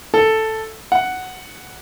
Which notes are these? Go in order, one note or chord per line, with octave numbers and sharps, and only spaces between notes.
A4
F#5